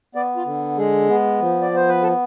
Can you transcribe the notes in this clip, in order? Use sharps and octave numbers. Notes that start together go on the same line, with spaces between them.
B3 D5
F4
D3
G#3 G#4
B3
F3
D5
B3 C5
B4
A4